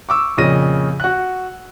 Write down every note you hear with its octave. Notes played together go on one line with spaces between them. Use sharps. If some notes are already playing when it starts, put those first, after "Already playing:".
C#6 D6 E6
F2 A#2 C#3 D#5 A#6 D#7
F#4 F#6